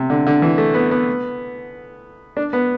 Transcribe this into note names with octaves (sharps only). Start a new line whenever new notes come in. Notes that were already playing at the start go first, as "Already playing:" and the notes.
Already playing: C3
D3
D3
E3
A3
B3
B3
D4
B3